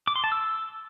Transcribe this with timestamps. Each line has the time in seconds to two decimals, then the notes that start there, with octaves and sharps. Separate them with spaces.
0.07 D6
0.16 C6
0.24 A5
0.32 E6